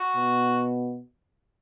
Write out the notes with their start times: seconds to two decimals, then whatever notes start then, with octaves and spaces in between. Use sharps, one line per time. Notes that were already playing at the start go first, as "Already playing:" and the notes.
Already playing: F#4
0.16 B2